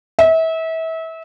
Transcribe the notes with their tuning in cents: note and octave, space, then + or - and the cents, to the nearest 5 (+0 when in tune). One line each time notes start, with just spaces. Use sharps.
E5 -30